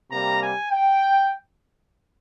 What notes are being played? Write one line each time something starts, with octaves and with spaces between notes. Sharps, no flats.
C3 G3 A#3 A#5
G#5
G5